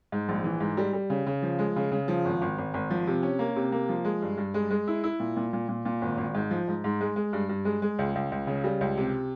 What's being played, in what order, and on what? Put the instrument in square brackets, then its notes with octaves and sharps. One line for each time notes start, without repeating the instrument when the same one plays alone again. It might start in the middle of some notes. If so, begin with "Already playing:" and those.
[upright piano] G#2
A#1
E3
G#2
G3
G3
C#3
C#3
F3
G#3
C#3
C#3
F3
G#1
G#1
G#1
G#1
F3
C3
C#4
A#3
C3
A#3
F3
G#3
G2
G2
G#3
G#3
E4
E4
A#2
A#2
A#2
A#2
A#2
G#1
G#1
G#2
F3
G#2
G#2
G#3
G#3
G2
G2
G#3
G#3
C#2
C#2
C#2
C#3
G3
C#2
C3